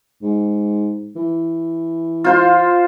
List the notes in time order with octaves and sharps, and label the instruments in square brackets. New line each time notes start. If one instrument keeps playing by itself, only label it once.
[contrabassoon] G#2
E3
[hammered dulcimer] F4 C5 C6